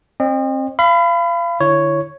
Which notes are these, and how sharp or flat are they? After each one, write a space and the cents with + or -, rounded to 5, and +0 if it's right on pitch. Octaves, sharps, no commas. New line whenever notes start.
C4 +30 D#5 -35
F5 -30 B5 +25
D3 +25 E4 +20 C#5 +0